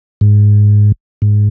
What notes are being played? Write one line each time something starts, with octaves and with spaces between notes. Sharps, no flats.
G#2
G#2